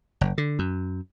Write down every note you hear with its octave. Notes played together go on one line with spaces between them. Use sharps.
F#1
D3
F#2